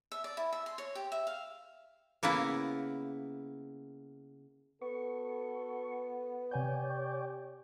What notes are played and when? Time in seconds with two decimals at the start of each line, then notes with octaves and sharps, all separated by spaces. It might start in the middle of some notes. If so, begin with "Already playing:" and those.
0.12 E5
0.24 D5
0.37 E4
0.53 E5
0.66 C6
0.78 C#5
0.95 G4
1.12 E5
1.27 F5
2.23 C#3 A#3 B3 E4
4.82 B3 F#4 A4 C#6
6.51 C3 G4 C#5 D5 G5 G#5 G6